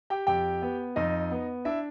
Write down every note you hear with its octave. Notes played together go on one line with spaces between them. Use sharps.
G4 G5
F2 G4 G5
B3
F2 D#4 D#5
B3
D4 E4 E5